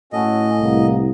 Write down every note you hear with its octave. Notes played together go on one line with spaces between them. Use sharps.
A2 C#4 F#4 A4 D#5
C2 A#3 B3